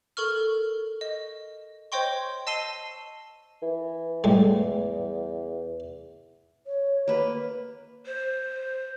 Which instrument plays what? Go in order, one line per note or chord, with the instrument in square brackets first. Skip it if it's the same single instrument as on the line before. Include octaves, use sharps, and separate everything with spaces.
[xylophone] A4 A#4 C#6 F6
D#5
C5 C#5 D#5 G5 C6 C#6
D#5 A5 E6 C7 D#7 G7
[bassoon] E3
[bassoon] E2 [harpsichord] A2 G3 G#3
[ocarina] C#5
[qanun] A#3 B4
[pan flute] C5